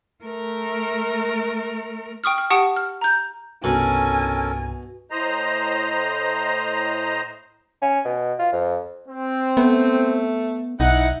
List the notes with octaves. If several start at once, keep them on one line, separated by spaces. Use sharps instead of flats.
A3 A#4
G5 C#6 D#6 F6
F6
G4 F#5 A5 C#6 D#6 D7
F6
A#5 G6
C2 G2 B2 C#4 A4 A#4 G#5
A2 C5 D#5 A#5
C#4
B2
F4
F2
C4
A3 B3
B1 D#4 E4 F#5